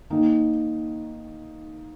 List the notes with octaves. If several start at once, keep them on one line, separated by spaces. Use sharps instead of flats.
D#3 A#3 D#4